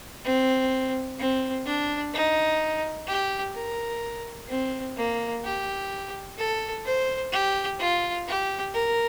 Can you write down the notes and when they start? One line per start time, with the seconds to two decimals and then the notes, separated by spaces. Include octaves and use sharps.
0.25 C4
1.19 C4
1.66 D4
2.14 D#4
3.08 G4
3.55 A#4
4.49 C4
4.97 A#3
5.44 G4
6.38 A4
6.86 C5
7.33 G4
7.80 F4
8.27 G4
8.74 A#4